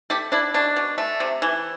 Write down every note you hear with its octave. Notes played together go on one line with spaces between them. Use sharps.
A3 G4
D4 E4
B2 D4
B2
A3
C3
E3